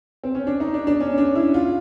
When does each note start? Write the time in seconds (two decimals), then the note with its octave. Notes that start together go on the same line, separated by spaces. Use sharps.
0.23 C4
0.35 C#4
0.47 D4
0.60 D#4
0.74 D4
0.87 D4
1.00 C#4
1.18 D4
1.35 E4
1.54 F4